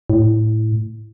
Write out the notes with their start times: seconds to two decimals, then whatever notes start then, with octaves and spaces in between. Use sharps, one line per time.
0.10 A2